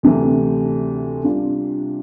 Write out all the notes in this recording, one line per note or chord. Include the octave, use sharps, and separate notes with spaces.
D2 C3 E3 A3
C3 G3 D4 F4